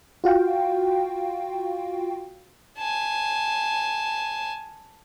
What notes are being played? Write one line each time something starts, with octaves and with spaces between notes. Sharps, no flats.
F4 F#4 F5 G5
G#5 A5